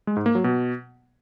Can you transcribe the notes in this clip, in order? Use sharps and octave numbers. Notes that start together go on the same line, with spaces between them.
G#3
G#2
A#3
F#3
B2